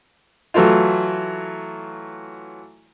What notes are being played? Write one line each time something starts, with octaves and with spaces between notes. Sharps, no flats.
E3 F#3 A3 E4 F4